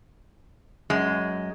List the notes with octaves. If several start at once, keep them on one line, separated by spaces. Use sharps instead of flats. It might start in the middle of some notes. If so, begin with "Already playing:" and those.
F#2 G#3